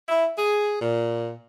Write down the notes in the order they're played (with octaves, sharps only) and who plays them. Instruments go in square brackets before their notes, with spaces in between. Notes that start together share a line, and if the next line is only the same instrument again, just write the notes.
[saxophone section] E4
G#4
A#2